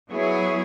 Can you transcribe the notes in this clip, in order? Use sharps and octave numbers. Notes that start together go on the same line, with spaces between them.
F#3 B3 E4 G#4 C#5